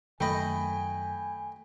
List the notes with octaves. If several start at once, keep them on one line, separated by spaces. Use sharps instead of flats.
F#2 D#3 A3 D#5 G5 G#5 B5